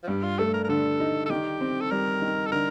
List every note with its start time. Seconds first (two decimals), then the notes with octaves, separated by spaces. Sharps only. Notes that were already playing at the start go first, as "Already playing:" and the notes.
0.03 F3
0.08 G2 G3
0.24 F4
0.39 A3 A4
0.54 A#4
0.64 A#4
0.69 D3 A4
1.00 D#4
1.26 A4
1.30 D#3 G4
1.61 C4
1.81 A4
1.91 G3 A#4
2.22 D#3
2.47 A4
2.52 D3 A#4